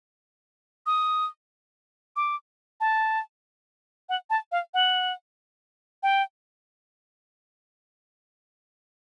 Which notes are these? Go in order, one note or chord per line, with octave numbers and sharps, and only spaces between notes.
D#6
D6
A5
F#5
A5
F5
F#5
G5